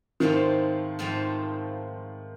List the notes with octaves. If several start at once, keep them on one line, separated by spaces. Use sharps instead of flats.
G#2 D#3 F3 A3 C4 F4
G#2 F3 A3 C4 F4